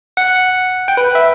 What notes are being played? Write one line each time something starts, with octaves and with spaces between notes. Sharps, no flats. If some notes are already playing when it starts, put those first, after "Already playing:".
F#5
G5
B4
E5